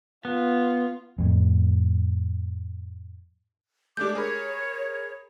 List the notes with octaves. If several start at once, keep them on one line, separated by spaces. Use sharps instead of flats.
B3 F4
F2 A2
G#3 A3 D4 G4 D6 G6
G#4 A#4 C#5 B5